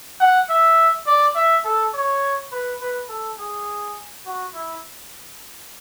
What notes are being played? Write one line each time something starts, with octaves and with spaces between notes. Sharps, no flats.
F#5
E5
D5
E5
A4
C#5
B4
B4
A4
G#4
F#4
E4